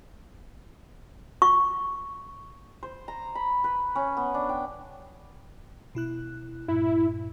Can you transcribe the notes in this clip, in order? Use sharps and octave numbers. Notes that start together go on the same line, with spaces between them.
C#6
C5
A#5
B5
B4
C#4
B3
D4
G5
B2 E4 F#6
G2 A#2 E4